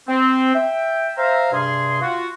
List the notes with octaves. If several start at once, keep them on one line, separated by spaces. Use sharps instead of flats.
C4
E5 G5
C5 E5 F5 A#5
G2 C3 G#4 C6
F4 F#4